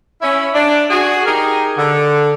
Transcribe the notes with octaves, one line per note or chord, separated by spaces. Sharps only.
C#4 E4
D4
F#4 G#4
D#4 G4 G#4 A#4
D3